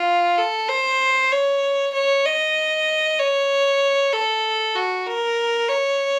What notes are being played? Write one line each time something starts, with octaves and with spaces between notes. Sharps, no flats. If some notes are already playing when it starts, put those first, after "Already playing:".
Already playing: F4
A4
C5
C#5
C#5
D#5
C#5
A4
F#4
A#4
C#5